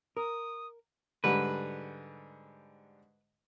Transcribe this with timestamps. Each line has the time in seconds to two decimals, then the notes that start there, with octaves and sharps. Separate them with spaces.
0.17 A#4 D#6
1.24 G#2 D3 G3 B4